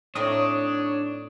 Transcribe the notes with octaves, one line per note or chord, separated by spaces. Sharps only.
A2 C4 D4 D#4 C#5 D#6